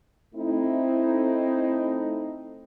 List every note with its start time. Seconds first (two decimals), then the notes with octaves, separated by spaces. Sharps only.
0.35 A3 C4 D#4 E4